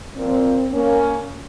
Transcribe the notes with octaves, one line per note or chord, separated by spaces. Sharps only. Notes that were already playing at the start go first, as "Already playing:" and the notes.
A#2 F3 A#3 C4
A#3 C#4